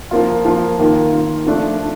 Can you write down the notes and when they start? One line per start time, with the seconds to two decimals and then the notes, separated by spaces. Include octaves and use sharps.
0.11 F3 A#3 F4
0.45 F3 A#3 F4
0.79 D#3 A#3 F4
1.13 D#3 A#3 F4
1.46 F3 A3 D4 F4